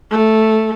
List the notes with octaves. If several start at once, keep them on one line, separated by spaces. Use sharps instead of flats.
A3